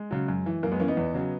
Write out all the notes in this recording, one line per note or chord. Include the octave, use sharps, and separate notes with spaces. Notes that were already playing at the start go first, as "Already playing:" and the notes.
Already playing: G#3
C#3 F#3
F#2
E3
F#2 A#3
G#3 B3
E3 A#3 C#4
B3 D#4
E2
C#3 F#3